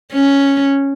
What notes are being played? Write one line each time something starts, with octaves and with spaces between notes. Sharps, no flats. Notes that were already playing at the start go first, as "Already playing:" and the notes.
C#4